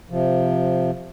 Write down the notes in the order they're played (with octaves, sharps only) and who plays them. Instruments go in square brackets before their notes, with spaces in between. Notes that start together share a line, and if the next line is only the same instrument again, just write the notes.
[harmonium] C3 F3